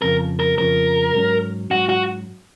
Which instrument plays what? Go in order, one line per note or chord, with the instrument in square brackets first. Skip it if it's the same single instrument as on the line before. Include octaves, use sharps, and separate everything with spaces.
[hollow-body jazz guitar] F2 C#3 F3 [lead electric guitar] A#4
[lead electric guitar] A#4
[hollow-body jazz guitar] F2 C#3 F3 [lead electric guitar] A#4
[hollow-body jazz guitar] G#2 F#3 C#4
[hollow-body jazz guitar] G#2 F#3 C#4 [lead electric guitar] F#4
[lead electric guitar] F#4